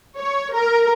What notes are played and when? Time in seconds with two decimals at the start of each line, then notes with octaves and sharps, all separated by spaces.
0.18 C#5
0.55 A#4